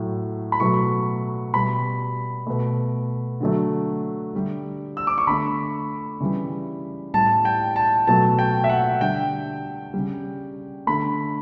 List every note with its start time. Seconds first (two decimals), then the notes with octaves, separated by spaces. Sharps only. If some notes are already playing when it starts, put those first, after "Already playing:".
Already playing: A2 F#3 A3
0.52 B5
0.60 B2 F#3 A3 C#6
1.54 B2 G3 B5
2.47 B2 A3
3.41 D3 F#3 A3
4.33 D3 G3
4.97 E6
5.07 D6
5.18 C#6
5.27 D3 A3 B5
6.20 C#3 E3 G3
7.14 A2 G3 A5
7.45 G5
7.76 A5
8.07 B2 F#3 A3 A5
8.39 G5
8.64 E5
8.69 F#5
9.01 D3 G3 G5
9.94 C#3 G3
10.87 D3 A3 B5